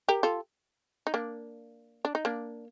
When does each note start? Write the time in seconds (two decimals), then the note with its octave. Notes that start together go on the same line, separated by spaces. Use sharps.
0.08 G4 A#4
0.23 F4 A4
1.07 D#4
1.14 A#3 D4
2.05 D4
2.15 D#4
2.25 A#3 D4